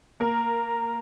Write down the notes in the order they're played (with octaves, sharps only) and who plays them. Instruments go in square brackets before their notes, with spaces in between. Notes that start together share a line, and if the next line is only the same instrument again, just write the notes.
[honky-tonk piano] A#3 A#4 [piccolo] A#5